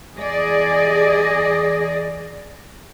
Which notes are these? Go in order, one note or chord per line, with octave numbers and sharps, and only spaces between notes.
E2 G#4 D5 D#5